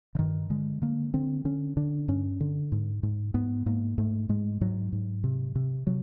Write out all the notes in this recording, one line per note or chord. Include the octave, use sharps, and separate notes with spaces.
D3
G2 D#3
D3 G#3
D3 A#3
D3 C4
D3 C#4
D3 D4
G2 C#4
D3
G#2
G#2
G#2 B3
G#2 A#3
G#2 A3
G#2 G#3
G#2 F#3
G#2
C3
C3
C3 F#3